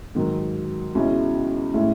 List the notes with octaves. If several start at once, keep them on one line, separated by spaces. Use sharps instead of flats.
G#2 D#3 F#3
C#2 B2 G#3 C#4 E4
A2 G#3 C#4 E4